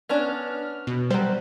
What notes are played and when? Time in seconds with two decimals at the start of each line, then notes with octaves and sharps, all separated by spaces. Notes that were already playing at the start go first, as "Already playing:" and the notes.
0.09 B3 C#4 D4 F6
0.87 B2
1.10 F#3 G3 C5